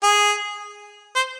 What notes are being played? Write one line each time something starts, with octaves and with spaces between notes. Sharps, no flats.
G#4
C5